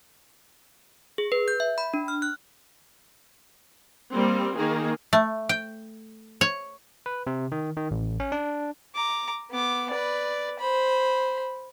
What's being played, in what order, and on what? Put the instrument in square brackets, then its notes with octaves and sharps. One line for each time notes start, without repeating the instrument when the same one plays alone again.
[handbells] G#4
B4
G6
E5
B5
D4
F6
F#6
[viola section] G3 A#3 C4
D#3 A#3 G#4
[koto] A3
G5
C#5
[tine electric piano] B4
C3
D#3
D#3
A1
C#4
D4
[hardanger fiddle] A#5 D6
B3 D6
B4 D5
C5 B5